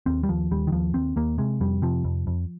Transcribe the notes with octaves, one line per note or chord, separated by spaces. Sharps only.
D#2 C4
G3
D#2 F3
D#2 G3
D#3
D#2 F3
D#2 C4
D#2 A#3
C3 G#3
F2 G3
C3 F3
F2
F2